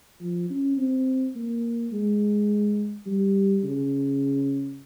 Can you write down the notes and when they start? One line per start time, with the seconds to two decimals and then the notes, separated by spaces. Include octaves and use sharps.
0.20 F3
0.50 C#4
0.77 C4
1.35 A#3
1.92 G#3
3.06 G3
3.64 C#3